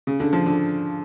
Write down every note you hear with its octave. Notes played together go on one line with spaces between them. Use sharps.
C#3
D3
F3
D3